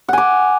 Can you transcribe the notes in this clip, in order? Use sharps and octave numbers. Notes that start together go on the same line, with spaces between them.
F#5 G#5 D6